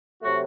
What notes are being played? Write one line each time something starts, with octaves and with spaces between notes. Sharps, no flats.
C3 F#3 A3 F#4